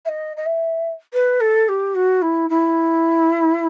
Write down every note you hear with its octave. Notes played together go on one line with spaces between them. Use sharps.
E5
D#5
D#5
E5
B4
A4
G4
F#4
E4
E4